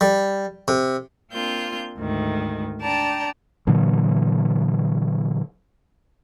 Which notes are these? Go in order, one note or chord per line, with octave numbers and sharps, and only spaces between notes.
G3
C3
A#3 C4 D4 F4 G6
D2 G#2 D#3
D4 D5 G5 A5 A#5
A#2 D3 E3 F#3